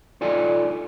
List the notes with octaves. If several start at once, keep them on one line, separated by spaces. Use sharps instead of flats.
D#4 F4 A4 D5 G#5